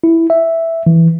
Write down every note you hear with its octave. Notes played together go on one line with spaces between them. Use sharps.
E4
E5
E3